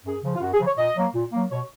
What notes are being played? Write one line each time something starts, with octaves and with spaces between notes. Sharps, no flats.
F#2 G#4
C#3 F3
F4
F#2 F#4
G#4
C#3 F3
C#5
A#2 D#5
F#3 A#3
A#2
F#3 A#3
B2 C#5